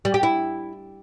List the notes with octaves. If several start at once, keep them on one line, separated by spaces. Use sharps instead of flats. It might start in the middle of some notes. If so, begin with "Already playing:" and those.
G3
G4
E4